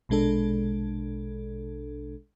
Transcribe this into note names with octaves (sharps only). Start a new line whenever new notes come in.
A#1 B2 G#3 D4 A4